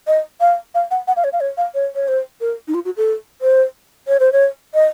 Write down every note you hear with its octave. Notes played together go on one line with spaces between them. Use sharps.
D#5
F5
F5
F#5
F#5
F5
C#5
F5
C#5
F5
C#5
C#5
C5
A#4
D#4
F4
F#4
A4
C5
C#5
C5
C#5
D#5